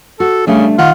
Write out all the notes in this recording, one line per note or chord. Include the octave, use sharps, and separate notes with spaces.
F#4 A4
C#3 G3 A3 D4
D#3 F4 F#5